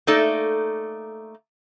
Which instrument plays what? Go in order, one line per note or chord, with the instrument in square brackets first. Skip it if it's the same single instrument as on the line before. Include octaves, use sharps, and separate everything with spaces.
[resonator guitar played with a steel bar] A3 A#3 D#4 A4 D5